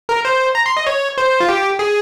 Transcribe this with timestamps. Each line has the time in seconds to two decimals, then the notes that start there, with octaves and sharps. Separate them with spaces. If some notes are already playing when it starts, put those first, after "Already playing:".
0.09 A#4
0.25 C5
0.55 A#5
0.66 C6
0.77 D#5
0.87 C#5
1.18 C5
1.40 F4
1.49 G4
1.79 G#4